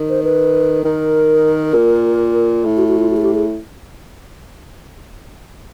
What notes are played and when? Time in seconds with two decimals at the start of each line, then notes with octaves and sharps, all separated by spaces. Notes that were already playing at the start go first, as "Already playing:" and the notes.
Already playing: D#3
0.09 C5
0.24 B4
0.84 D#3 A#4
1.75 A#2
2.65 A2
2.77 F#4
2.88 F#4
2.99 F4
3.10 F#4
3.17 G#4
3.22 G4
3.35 G#4